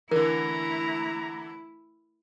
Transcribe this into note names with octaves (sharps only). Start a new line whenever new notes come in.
D3 E3 A3 E4 A#4 A#5